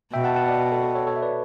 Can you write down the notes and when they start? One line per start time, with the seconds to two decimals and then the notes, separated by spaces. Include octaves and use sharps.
0.13 B2 E5 G5
0.24 F#5 A5
0.36 F#5 A5
0.48 D5 F#5
0.72 A4
0.83 B4
0.95 A4 C#5
1.07 A4 C#5
1.16 E5
1.22 B4 D5